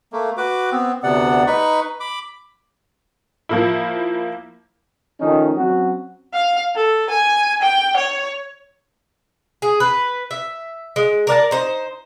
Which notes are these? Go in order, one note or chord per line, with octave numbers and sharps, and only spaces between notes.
A3 A#3
F#4 B4 D6
B3 C4
D2 C3 B3 D5 F#5
D#4 B4 B5 C#6
B5 D6
F3 A#3 E4
D#3 F3 A3 C#4 D#4
F#3 C4 C#4 F#4
F5
A4
G#5
G5
C#5
G#4
B4
E5
G#3
A#4 D5 F5 A5
D#4 C5